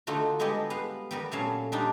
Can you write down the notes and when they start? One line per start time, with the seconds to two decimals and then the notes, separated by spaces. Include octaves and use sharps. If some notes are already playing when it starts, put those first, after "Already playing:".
0.07 D3 A3 D#4 F4 F#4
0.39 G3 G#3 B3 G4 A4 D#5
0.70 B3 B4 F5
1.11 G3 B3 A#4
1.31 A#2 F#3 A3 C#4 F5 A5
1.72 G3 D4 D#4 F4